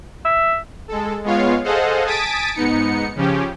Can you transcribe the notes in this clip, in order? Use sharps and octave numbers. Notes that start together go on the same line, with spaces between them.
E5
G#3 A4
G#3 B3 F4 C#5 F5
G#4 A4 C5 D#5 F5 F#5
G#5 A5 D#6 A6 B6 D7
G#2 B3 D#4 C#7
C#3 F3 C#4 G4